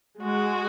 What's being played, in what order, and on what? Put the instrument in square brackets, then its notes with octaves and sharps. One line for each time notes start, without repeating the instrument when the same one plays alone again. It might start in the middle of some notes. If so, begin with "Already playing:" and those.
[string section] G#3 [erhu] F#4